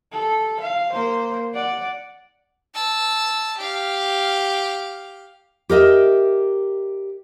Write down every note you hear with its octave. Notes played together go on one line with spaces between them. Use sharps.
A4
F5
A#3 C5
D5 F#5
A5 E6
G4 F5
G4 A#4 D#5 E5